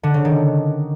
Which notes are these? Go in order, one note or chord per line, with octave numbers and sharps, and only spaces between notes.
D3
C#3
D#3